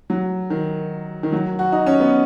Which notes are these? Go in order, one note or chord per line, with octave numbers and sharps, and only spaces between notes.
F#3
D#3
D#3
F#3
F#4
D#4
C#4
B3